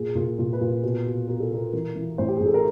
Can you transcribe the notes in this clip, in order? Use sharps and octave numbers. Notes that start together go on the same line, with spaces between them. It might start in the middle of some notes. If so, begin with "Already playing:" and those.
Already playing: A#2 G#4
A#2
A#2
B4
A#2
B2 B4
B2
B2 A#4
A4
B2 A#4
E3 A#4
E3
A2 C5
G4
A2 G#4
A4
A#4